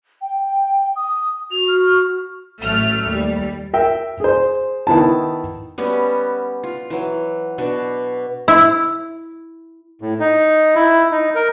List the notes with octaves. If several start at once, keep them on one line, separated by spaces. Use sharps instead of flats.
G5
D#6
F#4 F7
F6
A1 F#3 A3 F6
D#2 G3
A#4 E5 G5
G#4 C5
D#3 B3 E4 A5
G3 B3 C#4 F#4
F4
E3 F#3
B2 D4 F#4
E4
A2
D#4
E4
D#4
A#4